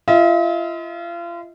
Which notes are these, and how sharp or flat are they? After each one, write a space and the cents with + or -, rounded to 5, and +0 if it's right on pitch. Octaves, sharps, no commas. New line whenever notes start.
F4 -35 D#5 +45